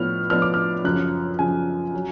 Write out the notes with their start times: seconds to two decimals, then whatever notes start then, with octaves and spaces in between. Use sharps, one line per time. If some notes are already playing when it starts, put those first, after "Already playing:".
Already playing: A2 F3 B3 D4 F6
0.30 A2 F3 B3 D4 F6
0.42 D6
0.54 F6
0.84 F#2 C#3 F3 F#6
1.39 F#2 C#3 F3 G#5
1.95 F#3